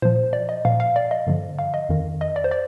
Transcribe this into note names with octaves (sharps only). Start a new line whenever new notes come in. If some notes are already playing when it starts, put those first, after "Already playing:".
A#2 F3 C5
D5
D#5
A#2 F3 F5
F5
D5
D#5
G2 D3 F3
F5
D#5
F2 D#3
D#5
D5
C5
D5